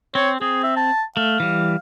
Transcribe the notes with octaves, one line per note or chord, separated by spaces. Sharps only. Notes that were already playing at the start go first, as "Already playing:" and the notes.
C4 C#5
C4 G#4
E5
A5
A3 F5
E3 G3